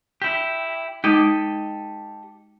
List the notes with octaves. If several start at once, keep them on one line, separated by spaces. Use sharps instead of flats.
E4 G4
G#3 D#4 G4 A4 D#5